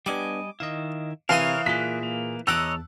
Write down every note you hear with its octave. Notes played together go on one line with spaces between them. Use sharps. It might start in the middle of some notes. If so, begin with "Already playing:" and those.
G3 B3 D4 G4 D#5 G#5 D6
D#3 E4 D#5 F5
C3 E3 A#4 C#5 F5 C6 D#6
A#2 A#3 F4 G#4 F#6 B6
A#3
E2 C#5 D#5 F#5 A5 A#5 D6 E6